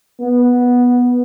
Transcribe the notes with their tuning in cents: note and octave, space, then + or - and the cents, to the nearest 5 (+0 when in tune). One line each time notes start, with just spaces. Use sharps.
B3 -10